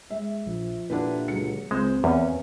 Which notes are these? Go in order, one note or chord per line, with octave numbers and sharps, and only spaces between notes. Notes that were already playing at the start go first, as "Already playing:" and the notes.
G#3 E5
A#1 F3
A#2 D3 D4 E4 G4 B4
C#2 F#3 C#7
C#2 G#3 C4 C5
E2 A#3 B3 C#4